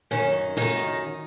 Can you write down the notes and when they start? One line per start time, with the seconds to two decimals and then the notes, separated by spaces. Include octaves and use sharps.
0.11 F#2 D#3 C#4
0.57 F#2 D#3 D#4